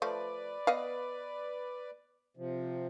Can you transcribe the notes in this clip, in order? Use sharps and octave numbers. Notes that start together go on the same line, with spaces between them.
F3 A3 B4 D5
B3 D#5 F5
C3 F3